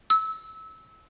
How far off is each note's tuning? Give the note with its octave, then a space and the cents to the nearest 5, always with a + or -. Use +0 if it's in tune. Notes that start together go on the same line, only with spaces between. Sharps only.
E6 -20